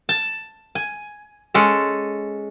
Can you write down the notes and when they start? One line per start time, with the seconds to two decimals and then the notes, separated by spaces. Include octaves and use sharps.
0.09 A5
0.75 G#5
1.54 G#3 C#4 A4